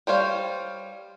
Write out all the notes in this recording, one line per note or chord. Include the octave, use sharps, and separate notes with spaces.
G3 C5 C#5 F5